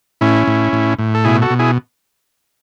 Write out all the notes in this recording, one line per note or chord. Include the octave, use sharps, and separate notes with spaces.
A2 C#4 E4
A2
A2
A2
A4
B2 E4 G#4
F#4 A4
B2
E4 G#4